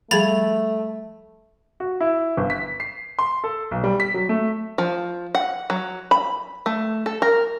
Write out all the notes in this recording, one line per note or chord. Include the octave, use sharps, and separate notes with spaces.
F3 G3 A3 G#4 B5 A6 F7
F#4
E4
G1
B6
C7
C6
A4
B1
G3
B6
F#3
A3
F3
F#5
F#3
B5
A3
A4
A#4